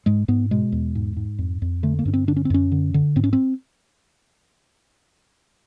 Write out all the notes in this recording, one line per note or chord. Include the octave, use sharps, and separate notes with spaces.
G#2 G#3
G#2 B3
B2 G#3
E2
G#2
G#2
F2
F2
D3 A3
A#3
G2 C#4
C4
D3 D4
C#4
C4
F#2 C#4
D3
D3
G#2 C4
C#4
C4